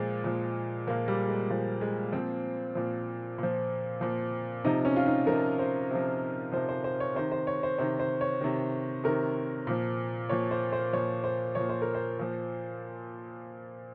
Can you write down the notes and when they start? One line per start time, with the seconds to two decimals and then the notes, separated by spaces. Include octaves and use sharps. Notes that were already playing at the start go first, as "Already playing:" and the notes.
Already playing: A#2 F3 G#3
0.24 A#2 F3
0.87 A#2 F3 A#3
1.08 G3
1.29 G#3
1.50 A#2 F3
1.81 G#3
2.12 A#2 F3 C4
2.75 A#2 F3
3.38 A#2 F3
4.01 A#2 F3
4.65 C3 F3 D#4
4.85 C#4
4.96 F4
5.07 D#4
5.27 C3 F3 A#4
5.59 C5
5.91 C3 F3
6.52 C3 F3 C5
6.69 C5
6.84 C5
7.00 C#5
7.15 C3 D#3 C5
7.32 C5
7.47 C#5
7.63 C5
7.78 C3 D#3 C5
7.99 C5
8.21 C#5
8.41 C3 D#3
9.04 C3 D#3 A#4
9.67 A#2 F3
10.29 A#2 F3 C#5
10.51 C5
10.72 C5
10.93 A#2 F3 C#5
11.24 C5
11.55 A#2 F3 C#5
11.69 C5
11.82 A#4
11.95 C5
12.19 A#2 F3